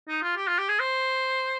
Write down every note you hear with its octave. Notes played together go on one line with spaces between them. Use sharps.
D#4
F4
G4
F4
G4
G#4
C5